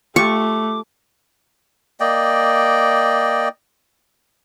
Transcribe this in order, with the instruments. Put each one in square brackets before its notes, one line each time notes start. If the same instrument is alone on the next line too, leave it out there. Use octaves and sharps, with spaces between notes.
[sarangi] A3 [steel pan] F4 G4 [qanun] C#6 [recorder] D6
[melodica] A#3 D5 D#5 G5